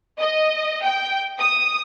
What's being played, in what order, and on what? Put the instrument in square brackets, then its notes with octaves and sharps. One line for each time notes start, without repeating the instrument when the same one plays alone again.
[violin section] D#5
G5
D#6